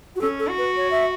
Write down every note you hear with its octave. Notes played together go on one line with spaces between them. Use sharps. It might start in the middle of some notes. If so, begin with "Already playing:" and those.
F#4
C#4 A4
A4
F#4
B4
C#5
E5